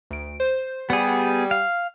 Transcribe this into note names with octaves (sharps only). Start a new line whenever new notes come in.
D2 D7
C5
G3 B3 G#4 F#5
F5